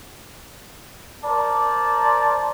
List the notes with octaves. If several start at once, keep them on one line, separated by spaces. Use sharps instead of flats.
A#4 C5 D5 A5